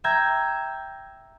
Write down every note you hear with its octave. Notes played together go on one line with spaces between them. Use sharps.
E5 G5 A#5 G#6